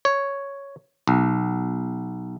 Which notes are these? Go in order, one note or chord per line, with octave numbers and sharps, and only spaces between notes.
C#5
B1